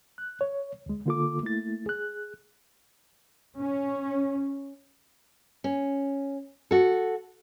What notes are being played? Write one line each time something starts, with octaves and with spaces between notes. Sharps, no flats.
F#6
C#5
D2 G#3
D3 A#3 F4 A4 D6
A3 A#3 E4 A6
G#4 F#6
C#4
C#4
F#4 A4